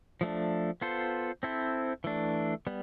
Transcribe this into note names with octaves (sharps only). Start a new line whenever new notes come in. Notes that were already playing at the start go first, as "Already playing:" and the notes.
F3 A3 D4
B3 F4 A4 C5
C4 E4 A4 C5
E3 A3 D4
G3 B3